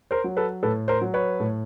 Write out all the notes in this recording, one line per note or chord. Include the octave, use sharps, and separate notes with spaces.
A#4 C5
F#3
A4 B4
A2 A4 B4
A#4 C5
F#3
B4 C#5
A2